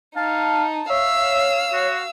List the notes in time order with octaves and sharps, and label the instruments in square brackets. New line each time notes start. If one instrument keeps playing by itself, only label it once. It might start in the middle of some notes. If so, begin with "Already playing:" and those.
[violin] D#4 [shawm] F5 [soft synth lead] A5
[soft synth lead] C#5 [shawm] E5 [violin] F5 E6
[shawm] F#4